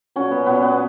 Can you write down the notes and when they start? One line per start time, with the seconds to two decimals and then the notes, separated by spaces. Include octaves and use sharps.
0.16 A#2 F#3 C#4
0.31 B3
0.46 A#2 F#3 B3
0.62 B3